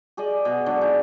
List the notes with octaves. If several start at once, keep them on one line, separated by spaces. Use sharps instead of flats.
G4 G#4 D5 D#5
B2 B3
D3 F#3 G#3
D#4